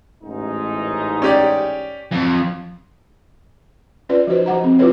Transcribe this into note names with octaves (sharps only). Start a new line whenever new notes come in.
A1 G#2 D#4
C#4 G4 D5
F2
C#4 F4 B4 D5
F3 D#4 F#4 B4 C5
F3 C5 F#5 A#5
C4
E4 F4 G4 A4 B4 C#5